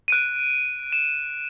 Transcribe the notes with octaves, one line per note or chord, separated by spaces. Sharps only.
F#6 D7 D#7
E7